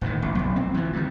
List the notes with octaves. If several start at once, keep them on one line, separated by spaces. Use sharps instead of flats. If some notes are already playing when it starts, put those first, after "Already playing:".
D#1 A2 D#3
A1
F1 B1
C4
E3 F3
G2 D#3